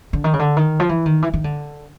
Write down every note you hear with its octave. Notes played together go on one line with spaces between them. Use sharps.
D3
D#3
C#3
D3
D#3
F3
E3
D#3
E3
D#3
D3